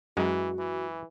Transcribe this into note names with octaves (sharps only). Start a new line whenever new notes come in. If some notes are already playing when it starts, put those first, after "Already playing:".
F#2 E3 G#3 F#4
E3